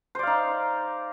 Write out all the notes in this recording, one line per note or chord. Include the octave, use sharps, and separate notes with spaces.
D#4 C5 D5 F5